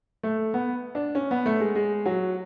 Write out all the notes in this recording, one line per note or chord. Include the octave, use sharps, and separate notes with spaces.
A3
B3
D4
C#4
B3
A3
G#3
G#3
F#3